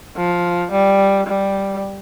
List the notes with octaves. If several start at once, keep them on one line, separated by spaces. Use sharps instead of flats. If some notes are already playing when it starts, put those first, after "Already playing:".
F3
G3
G3